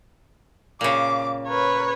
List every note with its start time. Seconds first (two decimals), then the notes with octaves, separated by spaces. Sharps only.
0.81 A#2 C#3 D6
1.47 A#4 B4 C#5